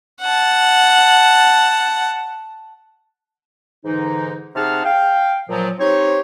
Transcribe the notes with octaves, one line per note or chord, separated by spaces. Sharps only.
F#5 A5
G#2 D3 E3 D#4
C3 D#4 G#4 F#5 A5 F6
F5 G5
A#2 F3 F#3
C4 D#4 G4 C5 C#5